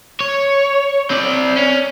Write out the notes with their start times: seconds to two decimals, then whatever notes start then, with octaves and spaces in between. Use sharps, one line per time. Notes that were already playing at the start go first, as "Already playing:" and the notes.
0.20 C#5
1.10 C4 D5
1.57 C#4